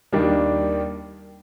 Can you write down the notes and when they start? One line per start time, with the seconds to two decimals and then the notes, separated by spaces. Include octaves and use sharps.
0.12 D#2 D#3 G3 A#3 D4